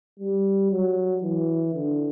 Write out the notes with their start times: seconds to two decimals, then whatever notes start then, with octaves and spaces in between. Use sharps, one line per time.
0.19 G3
0.70 F#3
1.23 E3
1.74 D3